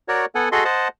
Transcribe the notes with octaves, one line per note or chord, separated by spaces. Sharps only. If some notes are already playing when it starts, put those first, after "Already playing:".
F#4 A#4 C#5 D5
B3 A4 F#5 G#5
F#4 G#4 A4 D#5 C6
C5 D#5 F#5 A5